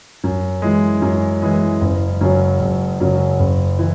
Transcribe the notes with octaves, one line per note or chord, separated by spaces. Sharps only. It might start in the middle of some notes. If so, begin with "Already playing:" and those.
F#2
E3 G#3
F#2
E3 G#3
F#1
F#2 C#3 F#3
F#1
F#2 C#3 F#3
F#1
E3